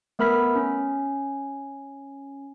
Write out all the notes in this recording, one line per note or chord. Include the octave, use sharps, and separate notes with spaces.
A3 B3 A#4 B5 F6 B6
C#4